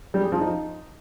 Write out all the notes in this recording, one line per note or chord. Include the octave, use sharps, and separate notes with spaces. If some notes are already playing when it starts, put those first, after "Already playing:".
G3
G#4
F3
D#4